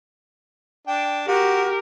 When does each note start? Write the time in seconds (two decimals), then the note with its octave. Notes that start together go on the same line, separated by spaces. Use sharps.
0.87 D4 G5
1.28 F#4 G4 A#4